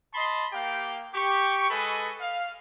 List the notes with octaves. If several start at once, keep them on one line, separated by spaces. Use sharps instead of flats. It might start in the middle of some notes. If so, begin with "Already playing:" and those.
D#5 A5 B5 C6
A#3 G4 F5 G5
G4 C#6
G#3 A4 B4 D#5 G#5 B5
F5